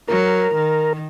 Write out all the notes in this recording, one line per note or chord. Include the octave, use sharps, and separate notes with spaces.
F#3 A#4
D#3